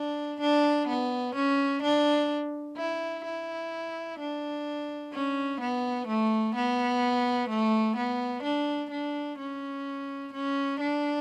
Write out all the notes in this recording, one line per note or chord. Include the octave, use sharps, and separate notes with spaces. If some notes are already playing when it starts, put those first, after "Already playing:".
Already playing: D4
D4
B3
C#4
D4
E4
E4
D4
C#4
B3
A3
B3
A3
B3
D4
D4
C#4
C#4
D4